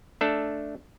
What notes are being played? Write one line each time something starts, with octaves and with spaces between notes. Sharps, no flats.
A3 D4 A4